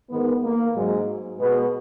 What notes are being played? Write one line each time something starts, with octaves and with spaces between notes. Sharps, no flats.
G#2 D#3 G#3 B3
A#3
G#2 F#3 G#3
B2 G#3 B3